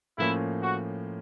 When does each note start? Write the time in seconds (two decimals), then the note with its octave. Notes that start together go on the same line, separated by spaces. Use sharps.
0.18 A2 F3 A#3 C#4 E4
0.63 F#4